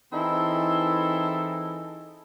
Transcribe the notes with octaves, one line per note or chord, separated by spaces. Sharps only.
E3 C4 D#4 E4 G#4 A4